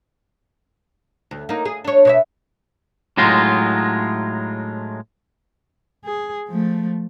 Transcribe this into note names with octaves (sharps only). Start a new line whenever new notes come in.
D2
A#3 D#4
G#4
D4 C#5
B2 C#5 E5
A2 F#3 G#3 D#4 F4
G#4
F3 A3